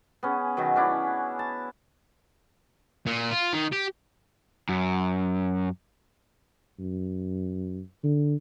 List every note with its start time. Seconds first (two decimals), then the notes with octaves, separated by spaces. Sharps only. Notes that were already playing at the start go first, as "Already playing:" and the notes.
0.23 B3 C#4 G#4
0.57 B2 D#3 F#3
0.76 C#4 D4 E4
1.39 A5
3.07 A#2
3.31 F4
3.53 D#3
3.72 G4
4.69 F#2
6.79 F#2
8.04 D3